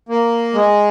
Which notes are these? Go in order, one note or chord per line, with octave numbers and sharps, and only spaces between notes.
A#3
G#3